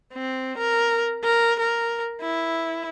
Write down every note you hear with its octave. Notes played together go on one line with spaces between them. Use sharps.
C4
A#4
A#4
A#4
E4